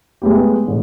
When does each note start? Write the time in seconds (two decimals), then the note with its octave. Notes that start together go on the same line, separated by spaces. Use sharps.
0.22 G#3 A3 B3 G4
0.68 A1